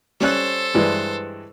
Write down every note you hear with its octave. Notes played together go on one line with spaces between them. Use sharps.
G3 C#4 A4 C5 F#6
G2 E3 G#3